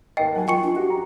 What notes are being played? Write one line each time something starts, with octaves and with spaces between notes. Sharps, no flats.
D#2 D#5 G5 C7
F#3 F#5 G#5
F4 G5 C#6 C#7
D4
F#4 G4
A#5